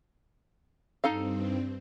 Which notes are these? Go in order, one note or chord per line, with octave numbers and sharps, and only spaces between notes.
G2 C4 D#4 A4 F5